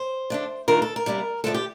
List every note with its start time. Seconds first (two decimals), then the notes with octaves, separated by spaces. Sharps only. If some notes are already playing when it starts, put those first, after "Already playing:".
Already playing: C5
0.30 D3 A3 D4
0.68 D#3 A3 D4 F4 A#4
0.82 A4
0.96 A#4
1.06 C3 G3 A#3 D4
1.44 D3 F3 A3 D4 A4
1.54 G4